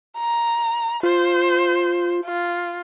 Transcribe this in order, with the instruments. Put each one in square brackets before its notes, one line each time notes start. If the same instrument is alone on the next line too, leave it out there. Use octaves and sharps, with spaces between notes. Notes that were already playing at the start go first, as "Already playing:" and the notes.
[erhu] A#5
[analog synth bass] F4 [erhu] C5
[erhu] F4